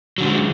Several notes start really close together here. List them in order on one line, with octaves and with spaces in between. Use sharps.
F#3 D3 G#3